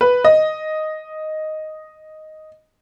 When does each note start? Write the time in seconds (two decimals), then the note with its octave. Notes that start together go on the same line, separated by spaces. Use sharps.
0.01 B4
0.24 D#5